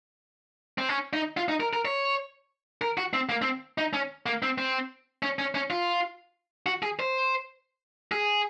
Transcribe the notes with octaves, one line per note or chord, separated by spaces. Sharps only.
C4
C#4
D#4
F4
D#4
A#4
A#4
C#5
A#4
F#4
C4
A#3
C4
D#4
C#4
A#3
C4
C4
C#4
C#4
C#4
F4
F#4
G#4
C5
G#4